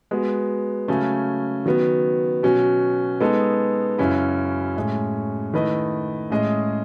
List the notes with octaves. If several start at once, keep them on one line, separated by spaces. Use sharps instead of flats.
G#3 B3 F#4
C#3 F#3 A3 C#4
D#3 F#3 B3
B2 F#3 C#4
G#3 B3 D#4 A4
F#2 C#3 F#3 C#4 E4
A2 G#3 C#4
D#3 A3 E4 B4 D#5
A2 G#3 C#4 G#4 D#5